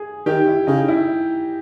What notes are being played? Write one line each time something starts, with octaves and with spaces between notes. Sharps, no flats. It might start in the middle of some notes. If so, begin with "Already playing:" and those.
Already playing: G#4
D#3 G4
E4
C#3 D#4
E4